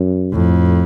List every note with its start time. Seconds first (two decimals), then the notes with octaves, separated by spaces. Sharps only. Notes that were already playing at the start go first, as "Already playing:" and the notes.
Already playing: F#2
0.33 F2 A2